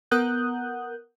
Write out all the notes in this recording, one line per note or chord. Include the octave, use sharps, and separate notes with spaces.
B3 A#4 F#5 D#6 F#6 G6